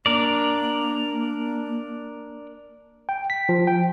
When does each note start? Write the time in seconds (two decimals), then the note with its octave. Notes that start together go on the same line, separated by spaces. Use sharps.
0.06 A#3 D4 A#4 D5
3.09 G5
3.30 B6
3.49 F3
3.67 G5